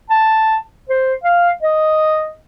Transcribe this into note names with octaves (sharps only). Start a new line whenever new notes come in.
A5
C5
F5
D#5